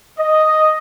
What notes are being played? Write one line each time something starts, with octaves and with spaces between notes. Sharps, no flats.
D#5